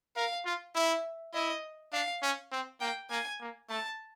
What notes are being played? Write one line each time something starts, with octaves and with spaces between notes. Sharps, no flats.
A#4 F5
F4
E4 E5
E4 D#5
D4 F5
C#4
C4
A#3 G5
A#3 G#5
A#3
A3 A5